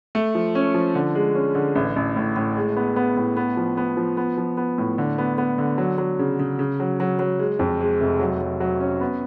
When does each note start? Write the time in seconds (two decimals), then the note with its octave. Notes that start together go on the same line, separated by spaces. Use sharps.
0.15 A3
0.35 F3
0.55 C#4
0.74 F3
0.95 D3
1.15 G#3
1.35 C#4
1.55 D3
1.75 A1
1.96 A1
2.16 A2
2.36 A2
2.57 G#3
2.77 B3
2.96 B3
3.16 A2
3.37 B3
3.57 F3
3.77 B3
3.97 F3
4.17 B3
4.38 F3
4.57 B3
4.78 A2
4.98 D3
5.18 B3
5.38 B3
5.58 D3
5.78 F#3
5.98 F#3
6.19 C#3
6.39 C#3
6.59 C#3
6.80 F#3
7.00 F#3
7.19 F#3
7.39 G#3
7.59 F2
7.80 G#3
8.00 F1
8.20 F#3
8.41 F#3
8.60 F#3
8.80 C#4
9.01 B3